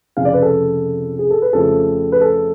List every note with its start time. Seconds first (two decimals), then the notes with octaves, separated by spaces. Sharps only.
0.17 F1 F2 C#3 F5
0.25 D5
0.34 B4
0.42 A4
1.19 G#4
1.30 A4
1.42 B4
1.53 F2 C#3 F3 A3 A4
2.12 B4
2.21 A4